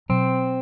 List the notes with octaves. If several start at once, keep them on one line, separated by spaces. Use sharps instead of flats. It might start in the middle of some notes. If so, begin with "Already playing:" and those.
B2 F#3 C4